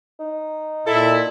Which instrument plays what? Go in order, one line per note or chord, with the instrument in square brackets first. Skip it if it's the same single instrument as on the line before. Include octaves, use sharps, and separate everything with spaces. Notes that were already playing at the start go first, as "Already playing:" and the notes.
[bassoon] D#4
[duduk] A#2 [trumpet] E4 [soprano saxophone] A4